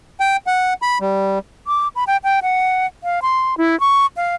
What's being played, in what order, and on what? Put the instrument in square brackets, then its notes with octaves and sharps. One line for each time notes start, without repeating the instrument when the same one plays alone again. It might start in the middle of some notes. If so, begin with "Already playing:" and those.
[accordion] G5
F#5
B5
G3
[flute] D6
B5
G5
G5
F#5
F5
C6
E4
C#6
F5